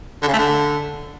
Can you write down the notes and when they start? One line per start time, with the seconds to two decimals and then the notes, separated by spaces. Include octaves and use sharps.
0.22 D3
0.28 C#3
0.33 A3
0.39 D3